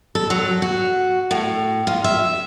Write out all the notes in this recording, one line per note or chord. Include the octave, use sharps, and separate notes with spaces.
A4
F#3
F#4
A2
F4
E5